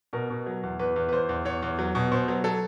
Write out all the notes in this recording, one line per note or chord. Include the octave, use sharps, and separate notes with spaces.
B2 A#4
B2
F#3
E2
E2 B4
E2
B4
E2 C5
E2
E2 C#5
E2
F#3
B2
B2 C5
F#3
F#3 A4